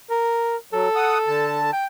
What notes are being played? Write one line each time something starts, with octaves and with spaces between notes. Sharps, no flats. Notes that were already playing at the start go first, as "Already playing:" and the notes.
A#4
F#3 A4
F#5 D#6
D3 A5
G5